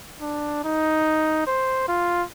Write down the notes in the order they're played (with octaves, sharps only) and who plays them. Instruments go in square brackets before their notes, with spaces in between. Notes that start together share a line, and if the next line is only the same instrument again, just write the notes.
[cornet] D4
D#4
C5
F4